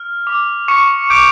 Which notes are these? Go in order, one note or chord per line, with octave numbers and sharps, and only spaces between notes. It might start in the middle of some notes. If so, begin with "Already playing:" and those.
Already playing: F6
D6
C#6 D6 C#7
D6 G6 D7